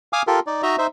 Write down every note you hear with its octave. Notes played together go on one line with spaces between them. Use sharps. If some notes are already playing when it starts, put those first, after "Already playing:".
F5 G#5 D6 D#6 F6
F4 G4 A4 A#4
D#4 D5
D#4 F#4 D#5 E5 A#5
D#4 C5 E5